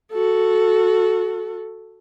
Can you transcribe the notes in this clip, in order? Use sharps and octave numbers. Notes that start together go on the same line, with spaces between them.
F#4 A4